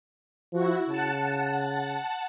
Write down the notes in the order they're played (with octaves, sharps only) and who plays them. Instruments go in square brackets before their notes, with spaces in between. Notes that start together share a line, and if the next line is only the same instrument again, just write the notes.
[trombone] F3 [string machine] E4 F#4
[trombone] C#3 [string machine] F#5 A5